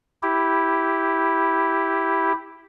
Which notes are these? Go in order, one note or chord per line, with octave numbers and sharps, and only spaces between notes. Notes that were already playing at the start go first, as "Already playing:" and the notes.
E4 G4